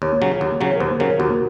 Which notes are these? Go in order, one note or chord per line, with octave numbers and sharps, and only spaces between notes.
D#2 C#5
C#3 F#3
D#2
C#3 F#3
A#4
D#2 C5
C#3 F#3 A#4
D#2 F#4